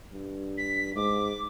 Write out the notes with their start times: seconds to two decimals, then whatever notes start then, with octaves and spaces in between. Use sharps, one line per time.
0.13 G2
0.57 B6
0.96 G#2 D6